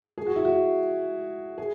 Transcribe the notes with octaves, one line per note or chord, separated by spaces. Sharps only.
G#4
F#4
E4
F#4
G#4